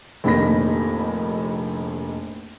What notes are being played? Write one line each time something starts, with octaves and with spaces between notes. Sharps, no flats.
F1 A#1 D#3 D#4 B5 A#6